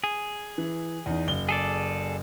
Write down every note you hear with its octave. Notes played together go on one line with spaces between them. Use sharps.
G#4
E3
E2 D#4
F#1 G7
G#4 A4 D5